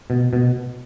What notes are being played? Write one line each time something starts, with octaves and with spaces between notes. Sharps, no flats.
B2
B2